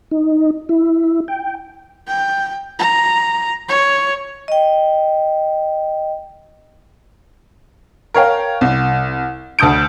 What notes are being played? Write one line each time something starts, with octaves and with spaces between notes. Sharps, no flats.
D#4
E4
G5
G5
A#5
C#5
D#5 G5
A#4 C#5 F5 G5
C2
D2 A5 D#6 G6 D7